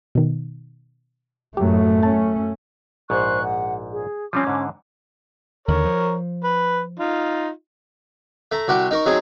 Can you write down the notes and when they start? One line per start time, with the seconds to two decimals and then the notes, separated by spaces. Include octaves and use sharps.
0.15 B2 D#3
1.57 F#2 A2 F#3 A3 G4
2.03 F#2 C#4 A5 A6
3.10 A#1 G#2 C5 C#6 F#6
3.44 F#5
3.92 G#4
4.33 F3 G3 C4 C#4 D6
4.47 G#2 D3
5.68 D#2 D3 A#4 C#5
5.85 F3
6.44 B4
7.00 D#4 F4
8.51 A3 A#5
8.68 C2 F#4 G4 F#5
8.91 D#4 A#4 C#6
9.06 F#3 C4 D#4 G#4